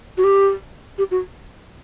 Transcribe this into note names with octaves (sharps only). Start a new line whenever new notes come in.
F#4
G4
G4
F#4